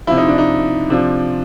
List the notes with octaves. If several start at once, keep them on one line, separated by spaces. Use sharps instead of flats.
C3 F3 E4
D#4
D4
D#4
C3 F3 D4